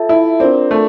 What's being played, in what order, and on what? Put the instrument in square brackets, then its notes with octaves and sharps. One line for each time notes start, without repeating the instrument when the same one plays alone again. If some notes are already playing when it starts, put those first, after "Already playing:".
Already playing: [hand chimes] F4 A4 E5 A5
[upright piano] E4
[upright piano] C4 [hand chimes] D4 F4 A#4 D5
[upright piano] A3